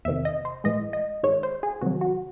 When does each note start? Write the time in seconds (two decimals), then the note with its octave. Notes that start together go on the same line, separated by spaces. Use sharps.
0.05 E2 C3 D#3 E5
0.25 D#5
0.45 C5
0.64 A2 E3 G#3 D#5
0.93 D#5
1.23 G#2 D#3 G#3 C#5
1.43 C5
1.63 G#4
1.81 C3 D#3 F#3 F#4
2.01 F#4